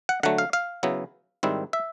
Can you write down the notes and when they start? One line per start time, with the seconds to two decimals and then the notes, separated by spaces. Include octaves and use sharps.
0.09 F#5
0.23 D3 F#3 A3 F#5
0.38 F5
0.53 F5
0.83 C#3 F#3 B3 E4
1.43 G#2 D#3 G3 C4 E4
1.73 E5